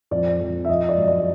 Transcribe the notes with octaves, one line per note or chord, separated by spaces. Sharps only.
F2 D5
F2
E5
F3 D#5
D5
F#2
D5